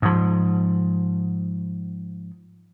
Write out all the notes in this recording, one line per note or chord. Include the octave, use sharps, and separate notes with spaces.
G#2 F3